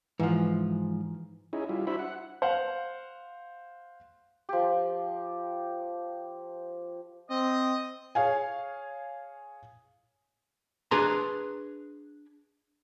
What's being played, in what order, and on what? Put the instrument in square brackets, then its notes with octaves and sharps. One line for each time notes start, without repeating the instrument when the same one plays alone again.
[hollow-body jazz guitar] G#2 F3 [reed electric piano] E3
[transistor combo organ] C#4 D#4 E4 G#4
G3 E4 F4
D4 E4 F#4 C5 E5 B5
F#5
[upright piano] C5 F5 F#5
[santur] F3 G4
[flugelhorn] C4 [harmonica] D#5 D#6
[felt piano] G#4 C#5 F5 G#5
[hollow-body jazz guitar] D4 G#4 B4 A#5 C6